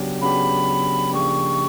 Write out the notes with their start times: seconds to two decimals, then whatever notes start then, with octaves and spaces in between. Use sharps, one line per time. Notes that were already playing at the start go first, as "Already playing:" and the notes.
Already playing: C#3 F#3 B3 D4 G4
0.21 C#3 F#3 B3 D4 G4 B5
1.13 C#3 F3 A#3 D4 G4 C#6